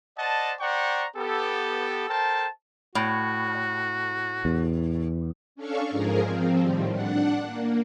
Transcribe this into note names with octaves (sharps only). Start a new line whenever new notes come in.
C5 D5 D#5 F#5 A5
C5 D5 F#5 G5 A#5 C#6
B3 G4 A4
A4 A#4 C5 G5 A5
A2 F#4
E2
C#4 D4 A4 F5 C#6
G#2 F3 G#4 A#4
F3 C4
A2 D#3 G3
D4 F#5
A#3